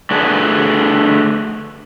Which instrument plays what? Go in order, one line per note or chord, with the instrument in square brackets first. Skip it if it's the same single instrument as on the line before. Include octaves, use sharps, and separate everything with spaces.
[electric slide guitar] D3 A3 G#4 B4